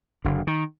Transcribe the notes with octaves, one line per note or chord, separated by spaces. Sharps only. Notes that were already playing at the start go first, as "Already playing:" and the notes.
F#1 D3
D#3